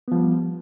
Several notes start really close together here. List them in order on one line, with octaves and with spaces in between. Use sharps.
B3 F3 G3